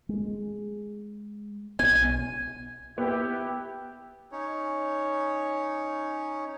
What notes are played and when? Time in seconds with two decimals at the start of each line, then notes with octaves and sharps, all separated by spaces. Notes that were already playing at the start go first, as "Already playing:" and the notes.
0.09 G#3
1.79 B1 B3 G#5
2.98 B3 E4 G4
4.32 C#4 D#4 C#5